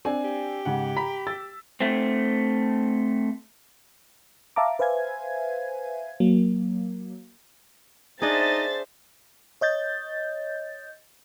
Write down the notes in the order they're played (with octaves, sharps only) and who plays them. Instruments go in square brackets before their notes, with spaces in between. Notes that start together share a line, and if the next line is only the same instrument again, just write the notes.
[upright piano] C4 D4 G#5
[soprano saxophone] G4
[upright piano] G#2 C#3 F#5
A#5 B5 B6
E6 A6
[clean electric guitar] A3 C4
[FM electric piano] E5 F5 A5 A#5 D6
B4 C5 E5 F5 G#5 G#6
F#3 A#3
[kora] D4 G#4 [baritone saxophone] D#4 [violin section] C5 E5 A6
[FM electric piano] C#5 D#5 G6 A6